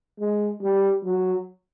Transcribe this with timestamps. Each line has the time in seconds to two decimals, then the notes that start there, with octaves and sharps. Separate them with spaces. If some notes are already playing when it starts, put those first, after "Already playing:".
0.20 G#3
0.62 G3
1.03 F#3